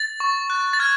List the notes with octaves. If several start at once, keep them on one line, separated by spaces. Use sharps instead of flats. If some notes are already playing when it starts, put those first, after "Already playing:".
Already playing: A6
C#6
F#6
A6
F6 G#6